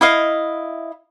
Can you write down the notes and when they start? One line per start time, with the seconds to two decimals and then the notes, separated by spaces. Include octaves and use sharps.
0.01 E4 D#5 F5